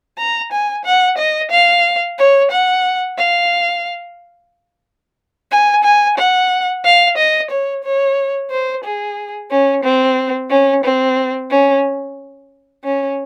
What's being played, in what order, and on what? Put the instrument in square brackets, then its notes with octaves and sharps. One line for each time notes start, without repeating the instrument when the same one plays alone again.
[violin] A#5
G#5
F#5
D#5
F5
C#5
F#5
F5
G#5
G#5
F#5
F5
D#5
C#5
C#5
C5
G#4
C#4
C4
C#4
C4
C#4
C#4